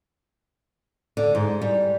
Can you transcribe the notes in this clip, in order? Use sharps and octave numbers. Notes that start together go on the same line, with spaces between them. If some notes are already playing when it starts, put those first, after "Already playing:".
D3
G#2
G3